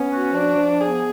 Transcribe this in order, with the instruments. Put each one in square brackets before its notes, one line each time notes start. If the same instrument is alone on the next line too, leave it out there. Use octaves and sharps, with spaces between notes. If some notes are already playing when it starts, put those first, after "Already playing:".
Already playing: [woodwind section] B3 [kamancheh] C#4
[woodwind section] F#4
[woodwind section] F3 [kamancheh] D4
[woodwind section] F3
[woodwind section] B3 [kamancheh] G#4